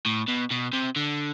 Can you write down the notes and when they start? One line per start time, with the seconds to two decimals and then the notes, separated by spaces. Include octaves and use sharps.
0.06 A2
0.28 B2
0.51 B2
0.73 C3
0.96 D3